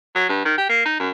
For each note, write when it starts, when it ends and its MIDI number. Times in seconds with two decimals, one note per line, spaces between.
0.15 0.28 54
0.29 0.42 43
0.45 0.57 51
0.57 0.66 67
0.69 0.84 58
0.85 0.95 63
0.99 1.10 42